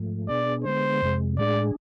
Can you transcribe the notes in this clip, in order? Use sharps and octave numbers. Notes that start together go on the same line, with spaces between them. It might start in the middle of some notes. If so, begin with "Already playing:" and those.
Already playing: G#2 F3 A3
B2 B3 D4 G#4 D5
D3 G#3 B3 C5
F2 C3 G#3
A2 G#3 D4 G#4 D5